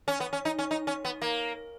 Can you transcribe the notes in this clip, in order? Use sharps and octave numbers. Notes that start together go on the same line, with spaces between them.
C#4
B3
C#4
D#4
C#4
D#4
C#4
B3
A#3